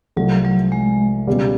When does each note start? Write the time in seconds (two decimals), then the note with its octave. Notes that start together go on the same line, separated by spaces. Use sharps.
0.16 C2 C3 F3 F#3 A3
0.45 F#3
0.72 G#3
1.27 C#2 B2 G3